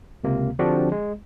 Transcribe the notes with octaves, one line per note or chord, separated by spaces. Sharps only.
C#2 C3 A#3
D3 F3 C4 D4 F#4 G4
G#3